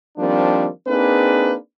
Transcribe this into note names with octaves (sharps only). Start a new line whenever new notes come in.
D#3 F3 G3 A#3 C4 D4
A#3 C4 D4 D#4 G#4 B4